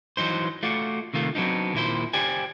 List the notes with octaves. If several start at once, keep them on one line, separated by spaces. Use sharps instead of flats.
E3 F#3 D#4 C5
A3 F4 F#4 D5
C3 D#3 A3 F4
F#3 B3 C4 D4 D#4
D#2 A#2 E4 C5
G4 C5 D5 G5 G#5